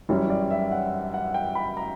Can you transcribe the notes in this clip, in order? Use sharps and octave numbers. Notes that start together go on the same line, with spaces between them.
F#2 E3 G3 C#5
D5
E5
F#5
F#5
G5
B5
A#5